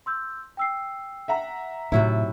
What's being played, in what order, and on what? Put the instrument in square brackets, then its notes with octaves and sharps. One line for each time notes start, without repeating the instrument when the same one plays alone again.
[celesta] C6 E6 G6
G5 E6 C7
[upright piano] E5 F#5 A#5
[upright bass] A2 [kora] C3 F#3 E4 [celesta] D#4